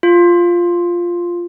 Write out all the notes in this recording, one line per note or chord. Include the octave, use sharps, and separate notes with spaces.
F4